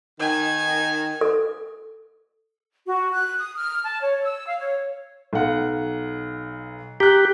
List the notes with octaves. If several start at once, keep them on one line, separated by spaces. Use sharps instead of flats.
D#3 G#5
A4
F#4
F#6
D#6
F6
A5
C#5
E6
F5
C#5
B1 F5 F#5
G4 A#5 F#6